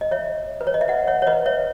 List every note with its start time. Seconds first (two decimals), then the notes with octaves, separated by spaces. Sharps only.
0.01 D#5
0.11 C#5 E5
0.61 B4
0.67 C#5
0.74 D#5
0.81 E5
0.88 D#5 F#5
1.07 C#5 E5
1.22 C#5
1.27 B4 D#5
1.46 C#5 E5